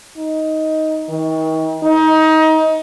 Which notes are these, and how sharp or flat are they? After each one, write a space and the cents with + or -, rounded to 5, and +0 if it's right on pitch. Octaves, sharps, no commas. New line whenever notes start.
D#4 +10
D#3 +40
D#4 +25